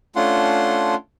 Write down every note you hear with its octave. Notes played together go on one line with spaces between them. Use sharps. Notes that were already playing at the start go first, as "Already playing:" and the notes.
A3 C#4 D4 F4 F#5 C6